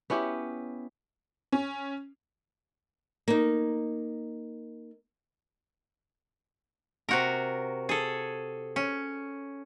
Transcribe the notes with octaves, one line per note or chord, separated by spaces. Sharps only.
B3 C#4 E4 G4
C#4
A#3 D#4
C3 F#4 A#4
G#4 A4
C#4